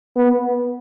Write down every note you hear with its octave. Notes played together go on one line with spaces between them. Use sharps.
B3